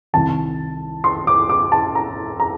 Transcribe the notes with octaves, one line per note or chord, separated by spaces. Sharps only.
C2 C3 D#3 A5
C6
D6
D6
A5
A#5
A#5